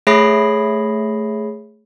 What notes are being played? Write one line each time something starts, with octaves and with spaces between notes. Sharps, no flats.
A3 G#4 C#5 B5 A#6 C7